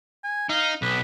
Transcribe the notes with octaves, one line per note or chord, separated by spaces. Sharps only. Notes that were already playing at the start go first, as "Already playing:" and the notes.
G#5
D#4 F5
B1 B4